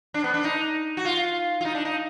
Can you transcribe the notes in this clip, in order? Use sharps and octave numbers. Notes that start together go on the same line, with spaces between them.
D4
B3
D4
D#4
F#4
F4
F4
D#4
D4
D#4